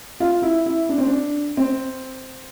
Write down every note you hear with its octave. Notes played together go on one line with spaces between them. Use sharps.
F4
E4
E4
D4
C4
D4
C4